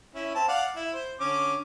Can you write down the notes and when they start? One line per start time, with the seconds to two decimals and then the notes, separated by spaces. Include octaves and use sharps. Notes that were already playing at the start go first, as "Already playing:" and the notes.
0.15 C#4 E4
0.35 C4 A5
0.48 D5 F5 F#5
0.76 E4
0.94 C5
1.20 D3 C#4 D6